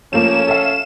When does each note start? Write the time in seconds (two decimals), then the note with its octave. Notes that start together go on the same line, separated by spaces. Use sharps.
0.13 F3 A3 A#3 C#4 E7
0.47 A4 E5 F5